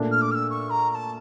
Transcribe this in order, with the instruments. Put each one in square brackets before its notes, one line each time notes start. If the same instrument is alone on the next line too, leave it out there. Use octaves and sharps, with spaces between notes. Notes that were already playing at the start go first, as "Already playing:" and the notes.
Already playing: [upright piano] A#2 A3 D4
[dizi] F6
D6
F6
E6
C#6
A#5
A#5
A5